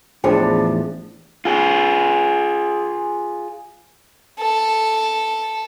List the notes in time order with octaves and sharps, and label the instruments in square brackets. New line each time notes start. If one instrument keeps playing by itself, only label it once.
[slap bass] A1 [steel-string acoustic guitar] E2 F3 [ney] D4 [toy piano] G#4 G5
[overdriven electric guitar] F4 G#4
[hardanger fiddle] A4